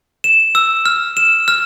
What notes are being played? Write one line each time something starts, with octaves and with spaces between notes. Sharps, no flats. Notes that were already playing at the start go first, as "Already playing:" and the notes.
E7
E6
F6
E7
F6